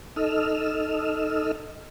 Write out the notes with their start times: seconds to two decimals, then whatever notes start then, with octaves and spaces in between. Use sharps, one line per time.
0.16 D#4 A4 D#5 E6 F6